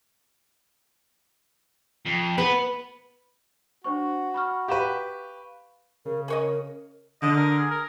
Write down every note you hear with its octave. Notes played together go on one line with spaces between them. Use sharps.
F2
B3 B4
D4 F#4 C5 C#6
B5 C#6 F6
G4 B4 F5 C#6 E7
C#3 A#4
G#4 A#4 C#5 D#5
D3 D#5
A#4
G#4
A#4